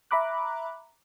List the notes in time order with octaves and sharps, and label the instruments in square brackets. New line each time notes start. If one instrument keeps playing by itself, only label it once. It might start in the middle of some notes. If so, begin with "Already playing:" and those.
[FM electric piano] E5 A#5 B5 D6 F#6